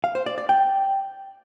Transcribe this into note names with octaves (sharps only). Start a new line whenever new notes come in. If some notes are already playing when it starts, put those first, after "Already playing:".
F5
C5
D5
D5
G5